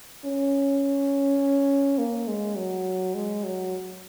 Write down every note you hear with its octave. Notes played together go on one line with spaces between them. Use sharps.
C#4
A#3
G#3
F#3
G#3
F#3